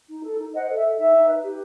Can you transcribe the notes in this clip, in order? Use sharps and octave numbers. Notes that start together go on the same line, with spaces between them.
D#4
A4
D#4
C5 D#5 F#5
A4
E5
A4
D#4 E5
D#4
B4
G4